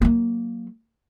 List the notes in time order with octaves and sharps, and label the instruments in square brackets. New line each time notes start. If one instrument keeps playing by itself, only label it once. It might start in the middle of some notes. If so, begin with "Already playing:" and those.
[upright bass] F#3 A#3